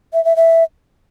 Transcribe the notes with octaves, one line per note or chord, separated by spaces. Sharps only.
E5
E5
E5